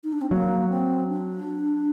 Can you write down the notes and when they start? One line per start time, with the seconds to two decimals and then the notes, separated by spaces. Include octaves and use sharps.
0.04 D#4
0.13 D4
0.21 C4
0.31 F#3 A#3
0.70 C4
1.08 D4